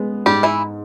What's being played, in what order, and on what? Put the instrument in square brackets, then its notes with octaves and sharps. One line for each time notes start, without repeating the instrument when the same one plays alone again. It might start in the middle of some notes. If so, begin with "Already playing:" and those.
Already playing: [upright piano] G#3 B3
[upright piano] G#2 [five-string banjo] G3 G4
[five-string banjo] E3 E4